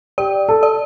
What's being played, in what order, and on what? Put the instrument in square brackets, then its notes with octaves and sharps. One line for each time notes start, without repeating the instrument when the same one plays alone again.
[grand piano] G4 [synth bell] D5
[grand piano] A4
[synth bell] D5